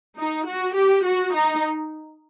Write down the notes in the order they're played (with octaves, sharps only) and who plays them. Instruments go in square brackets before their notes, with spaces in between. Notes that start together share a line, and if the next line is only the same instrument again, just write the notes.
[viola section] D#4
F#4
G4
F#4
D#4